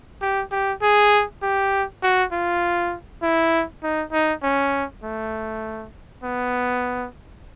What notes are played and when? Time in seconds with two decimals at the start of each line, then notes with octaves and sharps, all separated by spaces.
0.22 G4
0.52 G4
0.82 G#4
1.42 G4
2.03 F#4
2.32 F4
3.22 E4
3.83 D#4
4.12 D#4
4.43 C#4
5.03 A3
6.23 B3